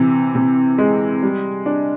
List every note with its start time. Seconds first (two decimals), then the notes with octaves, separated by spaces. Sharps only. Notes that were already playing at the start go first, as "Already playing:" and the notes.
Already playing: C3 E3
0.35 C3
0.78 G#3
1.23 G3
1.66 D4